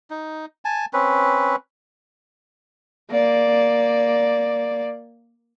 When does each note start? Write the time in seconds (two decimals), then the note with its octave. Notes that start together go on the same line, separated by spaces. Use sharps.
0.10 D#4
0.65 G#5 A5
0.93 C4 C#4 B4
3.11 A#3 D5